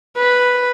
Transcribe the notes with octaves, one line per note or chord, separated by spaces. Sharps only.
B4